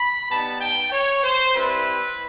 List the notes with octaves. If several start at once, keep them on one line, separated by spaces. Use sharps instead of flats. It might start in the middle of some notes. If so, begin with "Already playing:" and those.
Already playing: B5
G3 B3 D#4 A5
G5
C#5
C5
G3 C4 E4 B4